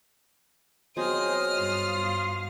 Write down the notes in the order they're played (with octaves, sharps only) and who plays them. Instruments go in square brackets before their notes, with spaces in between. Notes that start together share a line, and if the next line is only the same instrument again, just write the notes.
[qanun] B2 F#3 C4 [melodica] G#4 C5 D#5 [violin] D#6 F6
[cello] G2 F5 [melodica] F4
[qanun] B2